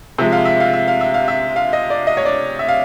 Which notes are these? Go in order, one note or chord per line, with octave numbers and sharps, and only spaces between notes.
C3 F3 G#3 E5
F5
E5
F5
E5
F5
E5
F5
E5
F5
D#5
D5
D#5
C#5
D5
E5
F5